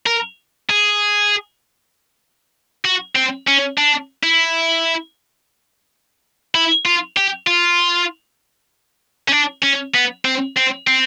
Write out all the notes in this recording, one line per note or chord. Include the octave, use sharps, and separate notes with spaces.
A#4
G#4
F#4
C4
C#4
D4
E4
E4
F4
G4
F4
C#4
D4
C#4
B3
C4
C4
C4